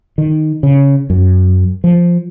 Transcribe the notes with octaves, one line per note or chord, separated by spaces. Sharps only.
D#3
C#3
F#2
F3